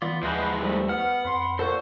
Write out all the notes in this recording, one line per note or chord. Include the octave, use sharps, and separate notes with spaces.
E3 B3 F4 D5
D#2 E3 F3 G#3 B4 C5 D#5 F#5
C2 G3 A3
B3 F#5 F6
F2 B5 C6
A#2 A4 C5 F#5 C#6